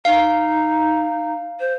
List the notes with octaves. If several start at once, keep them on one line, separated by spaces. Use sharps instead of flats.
D#4 F5
C5